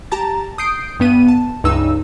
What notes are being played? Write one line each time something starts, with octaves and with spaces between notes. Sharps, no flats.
G4 A5 A#5 A6
D#6 G6 C7 D7
G2 B3 D#7
A5
C#2 G2 D#4 E6